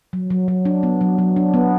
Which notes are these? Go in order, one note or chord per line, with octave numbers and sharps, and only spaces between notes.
F#3
F#3
F#3
D4
B3
F#3
F#3
D4
B3